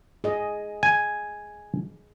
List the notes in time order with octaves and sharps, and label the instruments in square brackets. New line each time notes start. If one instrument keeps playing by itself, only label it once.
[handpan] G#4 D#5
[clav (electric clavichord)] G#5